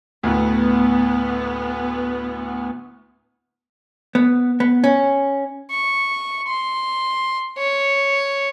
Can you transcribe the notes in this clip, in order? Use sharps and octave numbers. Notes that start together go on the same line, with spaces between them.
D2 A2 B3
B3
B3
C#4
C#6
C6
C#5